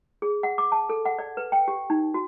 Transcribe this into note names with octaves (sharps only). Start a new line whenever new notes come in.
G#4
F#5
D6
A5
A4
F#5
D5
B4
G5
G4
D#4
F#4